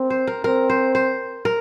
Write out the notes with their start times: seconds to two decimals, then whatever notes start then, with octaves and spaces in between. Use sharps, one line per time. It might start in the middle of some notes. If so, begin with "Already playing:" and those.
Already playing: C4 A#4
0.10 C5
0.27 A#4
0.44 C4 A#4
0.70 C5
0.95 C5
1.45 A#4